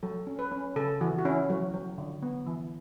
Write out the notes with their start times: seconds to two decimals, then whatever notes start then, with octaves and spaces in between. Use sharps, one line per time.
0.03 F#3 A4
0.27 C#4
0.39 B4
0.52 C#4
0.76 C#3 A4
1.01 E3 F#4
1.18 F#4
1.25 C#4 E4
1.50 F#3
1.74 F#3
1.98 D3
2.22 B3
2.46 E3